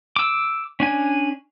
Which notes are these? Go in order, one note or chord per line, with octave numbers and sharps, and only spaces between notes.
D6 E6
C#4 D4 G#5